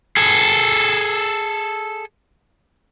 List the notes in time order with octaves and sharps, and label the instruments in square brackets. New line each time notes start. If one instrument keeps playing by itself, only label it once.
[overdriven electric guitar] G#4 A4